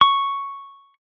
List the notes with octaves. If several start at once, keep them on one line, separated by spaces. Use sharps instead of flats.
C#6